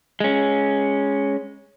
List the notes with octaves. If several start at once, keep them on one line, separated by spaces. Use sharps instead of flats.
G#3 C#4